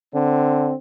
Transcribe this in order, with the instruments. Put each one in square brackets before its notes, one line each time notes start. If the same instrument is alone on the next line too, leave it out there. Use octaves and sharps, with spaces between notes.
[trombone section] D3 C4